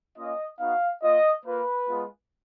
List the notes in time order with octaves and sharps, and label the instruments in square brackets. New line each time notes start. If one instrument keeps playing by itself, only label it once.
[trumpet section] A#3 C#4 F4 D#5
B3 D#4 F#4 F5
A#3 F4 D#5
A#3 F4 B4
G#3 B3 F4